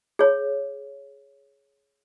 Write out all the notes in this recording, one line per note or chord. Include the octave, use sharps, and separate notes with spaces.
G#4 C#5